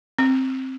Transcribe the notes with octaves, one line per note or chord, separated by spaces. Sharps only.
C4